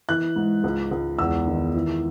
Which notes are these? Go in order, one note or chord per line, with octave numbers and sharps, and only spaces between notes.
E3 F#6
G#2
C#2
C#2
E2 E6
D#3
E3